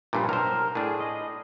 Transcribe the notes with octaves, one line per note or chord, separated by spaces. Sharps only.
A#1 G2 A#2
B1 A#4 C5
A2 D4 G#4
D#5